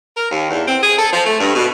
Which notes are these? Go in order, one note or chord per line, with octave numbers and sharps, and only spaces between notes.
A#4
D#2
E2
C4
G#4
A4
F3
A3
G2
B2